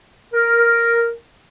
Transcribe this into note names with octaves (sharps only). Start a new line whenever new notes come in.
A#4